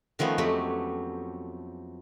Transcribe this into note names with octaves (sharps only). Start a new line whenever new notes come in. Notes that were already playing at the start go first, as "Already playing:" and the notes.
D#3 F3 A3 B3 C#4
F2 F#3 A3 G4 B5